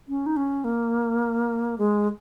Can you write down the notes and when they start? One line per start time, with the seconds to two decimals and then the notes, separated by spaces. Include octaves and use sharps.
0.08 C#4
0.26 D#4
0.37 C#4
0.64 A#3
1.78 G#3